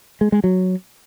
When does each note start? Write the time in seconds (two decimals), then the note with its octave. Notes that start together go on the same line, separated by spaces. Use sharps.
0.21 G#3
0.32 G#3
0.44 F#3